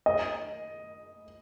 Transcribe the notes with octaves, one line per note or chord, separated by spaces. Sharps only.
D#5